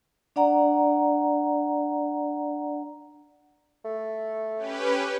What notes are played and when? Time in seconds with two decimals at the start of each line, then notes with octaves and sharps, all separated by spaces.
0.36 D4 D5 F#5 A#5
3.85 A3
4.56 C#4 G4 B4